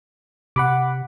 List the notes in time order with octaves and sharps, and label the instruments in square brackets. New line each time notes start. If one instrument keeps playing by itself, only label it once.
[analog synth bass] C3 [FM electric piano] F#5 B5 D6